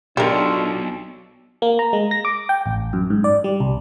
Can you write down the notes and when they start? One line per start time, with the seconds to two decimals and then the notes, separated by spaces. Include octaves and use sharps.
0.17 B1 B2 D4 F4 G4 A4 A#4
1.62 A#3
1.79 A#5
1.93 G#3
2.11 A#6
2.25 D6
2.49 G5
2.66 A1
2.93 F#2
3.10 G#2
3.24 D5
3.44 G3
3.60 C2